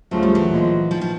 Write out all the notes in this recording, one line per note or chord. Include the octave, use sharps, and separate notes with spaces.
D2 C#3 F3 F#3 A3
G3
E3 F#3
A#2 F3 G#3
D#3 F3
F3